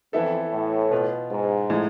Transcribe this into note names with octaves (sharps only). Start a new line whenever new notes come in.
F2 E3 B3 E4 A4 E5
A2
B2 B3 F4
G#2
A2 F3 G#3